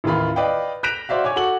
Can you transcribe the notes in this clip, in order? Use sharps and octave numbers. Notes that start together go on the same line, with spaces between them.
A1 D#2 D#3 F4 B5
B4 D5 D#5 F5 G5
F#6 G6 A#6 B6 D7 F7
F#4 C5 D5 E5 F5
C#5 G#5 D6 G#6
F#4 A4 C#6 F#7